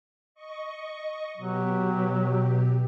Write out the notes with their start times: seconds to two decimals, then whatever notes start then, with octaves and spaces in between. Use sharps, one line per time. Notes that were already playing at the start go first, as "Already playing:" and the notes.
0.35 D#5 C#6
1.38 B2 F#3 G4